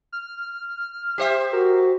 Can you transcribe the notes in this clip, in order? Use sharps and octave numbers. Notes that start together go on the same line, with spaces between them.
F6
G4 C5 E5
F#4 A#4